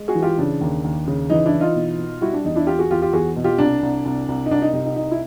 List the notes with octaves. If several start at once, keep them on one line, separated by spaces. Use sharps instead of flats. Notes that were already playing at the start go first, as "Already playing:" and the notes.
Already playing: G#3
F#4 G#4
E3
F4 G4
C#3 D4
D#2
D#2
C#3
E3 D#4
D4 E4
E3
D#4 F4
B2
B2
G3 E4 F#4
D4
E2 D#4
D4 E4
E2 F4 G4
F#4 G#4
E2 F4 G4
F4 G4
E2 F#4 G#4
B2
F4 G4
C2 D4
C2
C2
C2
D#4
C2 D4
D#4
C3 D#4
D#4
C2 D#4
E4